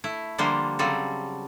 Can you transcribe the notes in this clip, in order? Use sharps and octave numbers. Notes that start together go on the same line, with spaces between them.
A3 E4
D3 F3 G3 A#3 C5
C#3 F#3 G3 C4 A4